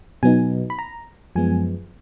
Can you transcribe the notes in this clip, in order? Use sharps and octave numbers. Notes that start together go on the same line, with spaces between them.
B2 F#3 B3 D#4 G#5
B5
A#5
F#2 F3 G#3 B3 G#5